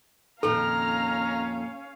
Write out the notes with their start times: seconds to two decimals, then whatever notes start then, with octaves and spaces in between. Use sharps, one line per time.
0.43 F2 A#2 D#3 C#4 A4 F5 A#5 F6